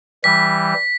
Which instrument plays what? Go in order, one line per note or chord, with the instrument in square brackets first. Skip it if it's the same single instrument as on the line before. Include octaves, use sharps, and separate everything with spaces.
[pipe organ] E3 G3 [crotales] B6